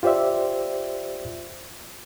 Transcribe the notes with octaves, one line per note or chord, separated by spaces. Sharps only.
F4 G4 C5 D5 E5